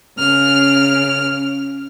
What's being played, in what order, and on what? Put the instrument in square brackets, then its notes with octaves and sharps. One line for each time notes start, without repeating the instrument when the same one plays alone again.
[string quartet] C#3 F6